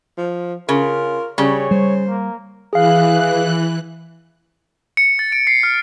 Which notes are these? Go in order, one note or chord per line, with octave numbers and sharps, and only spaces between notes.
F3
C#3 F4 A#4
C#3 G3 C#5
G3 C5
A#3
E3 G#4 F5 F#6
C#7
A6
D7
C7
F6